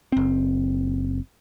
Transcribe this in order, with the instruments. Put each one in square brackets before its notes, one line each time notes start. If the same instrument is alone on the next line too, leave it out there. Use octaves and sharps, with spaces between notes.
[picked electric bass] F#1 C4